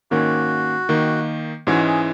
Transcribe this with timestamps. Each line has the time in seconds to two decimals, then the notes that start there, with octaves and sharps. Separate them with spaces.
0.11 G#2 D#3 A#3 C#4 F#4
0.89 D#3 A#3 D#4
1.67 G#2 E3 G#3 C#4 F#4
1.87 G#4